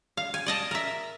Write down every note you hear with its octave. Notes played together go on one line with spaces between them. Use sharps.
F5
G#5
D5 D#5 A5
A#4 E5